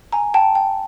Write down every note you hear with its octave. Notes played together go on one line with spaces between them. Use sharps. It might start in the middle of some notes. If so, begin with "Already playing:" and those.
G#5 A#5
G5 A5
G5